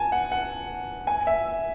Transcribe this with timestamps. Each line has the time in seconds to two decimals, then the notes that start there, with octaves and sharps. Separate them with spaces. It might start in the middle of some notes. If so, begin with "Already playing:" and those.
Already playing: G#5 A5
0.12 F#5
0.32 F#5
1.07 G#5
1.27 E5